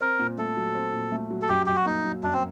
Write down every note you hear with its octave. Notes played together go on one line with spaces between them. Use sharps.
C4 A#4
A#2
A3 A4
F#3
C4
A#2
A3
F#3
A4
F#2 G4
F#2 G4
F#4
A#3 D#4
F#3
F#2 D4
C4